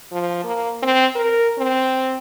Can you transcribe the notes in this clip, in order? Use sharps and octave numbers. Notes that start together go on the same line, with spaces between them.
F3
A#3
C4
A#4
C4